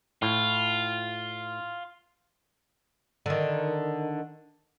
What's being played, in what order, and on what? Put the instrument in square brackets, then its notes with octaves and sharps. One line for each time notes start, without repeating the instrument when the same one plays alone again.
[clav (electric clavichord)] A2 [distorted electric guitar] F4
[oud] D3 D#3